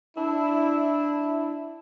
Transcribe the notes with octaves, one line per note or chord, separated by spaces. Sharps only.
D4 E4